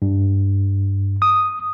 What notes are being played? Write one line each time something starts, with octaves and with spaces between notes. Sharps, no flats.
G2
D#6